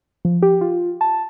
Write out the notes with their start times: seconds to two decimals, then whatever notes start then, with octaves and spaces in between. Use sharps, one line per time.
0.25 F3
0.43 G4
0.61 F4
1.01 A5